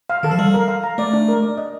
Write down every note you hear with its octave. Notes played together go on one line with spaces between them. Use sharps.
F5
D#3 A4
F3
G3 F5
A#4
F5
A#5
A3 D5
D4
A#4
D5
D#5